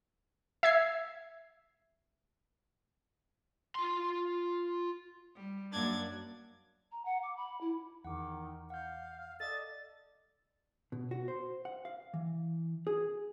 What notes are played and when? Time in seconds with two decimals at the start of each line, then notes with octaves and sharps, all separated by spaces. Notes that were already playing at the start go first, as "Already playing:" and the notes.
0.63 E5 G#6 C7
3.75 F4 C6
5.35 G3
5.72 F#2 A#3 D4 G#6 A6
6.92 A#5
7.05 F#5
7.23 D6
7.37 B5
7.61 E4
8.05 E2 D#3 F#5 D6
8.70 F5 F#5 G6
9.40 A4 D5 D#5 A6
10.92 B2
11.11 F#4
11.28 C5
11.65 F#5
11.85 F5
12.14 E3
12.87 G#4